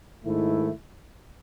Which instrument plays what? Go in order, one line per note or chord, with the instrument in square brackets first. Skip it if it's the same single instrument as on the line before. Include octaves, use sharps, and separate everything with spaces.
[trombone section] G#2 D#3 A3 E4